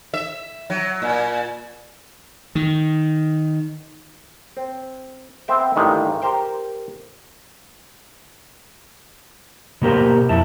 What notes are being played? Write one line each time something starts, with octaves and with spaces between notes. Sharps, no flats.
E5
F#3
A#2
D#3
C4
B3 C4 E5 G5
A1 G2 D#3 G#3
G4 A#4 C5 G5
B2 A#3 G4 A#4 C5
F2 E4 A5